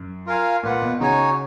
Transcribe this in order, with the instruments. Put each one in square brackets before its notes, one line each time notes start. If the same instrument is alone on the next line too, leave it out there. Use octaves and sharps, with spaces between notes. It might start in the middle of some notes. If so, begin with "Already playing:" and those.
Already playing: [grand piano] F#2
[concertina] F4 A#4 F5 G#5
[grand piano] A#2 [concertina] F4 B4 F#5
[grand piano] B2
[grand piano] C#3 [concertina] D#4 F#4 C#5 G#5